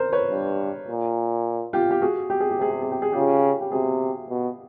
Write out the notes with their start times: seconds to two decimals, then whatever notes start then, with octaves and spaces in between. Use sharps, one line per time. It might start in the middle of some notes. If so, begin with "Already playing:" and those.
Already playing: A#4 C5
0.12 B4 C#5
0.31 G2
0.87 A#2
1.73 F4 G4
1.91 G4
2.02 F#4 G#4
2.30 G4
2.40 G#4
2.51 G4
2.58 C3 G#4
2.71 G4
2.82 G#4
2.91 G4
3.02 G#4
3.12 C#3 F4 G4
3.61 G4
3.72 C3 F#4 G#4
4.29 B2